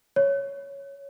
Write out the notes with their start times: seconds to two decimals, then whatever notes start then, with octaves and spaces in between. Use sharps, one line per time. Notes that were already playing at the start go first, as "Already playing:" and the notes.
0.16 C#5